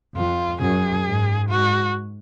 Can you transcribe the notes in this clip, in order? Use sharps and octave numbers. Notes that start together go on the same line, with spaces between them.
F2 F4
F#2 G#4
G#2
G#2 F#4